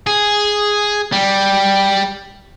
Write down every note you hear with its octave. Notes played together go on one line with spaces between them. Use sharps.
G#4
G3